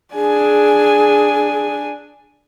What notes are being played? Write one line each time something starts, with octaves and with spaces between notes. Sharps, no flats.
D4 G#4 G#5